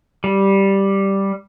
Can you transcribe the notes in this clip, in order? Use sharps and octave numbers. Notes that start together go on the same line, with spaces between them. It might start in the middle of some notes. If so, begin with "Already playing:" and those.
G3